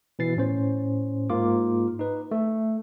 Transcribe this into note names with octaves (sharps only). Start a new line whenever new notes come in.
B2 E3 A6 C7
A2 C#4 C5
G#2 A#3 F4 D6
D#4 B4
A3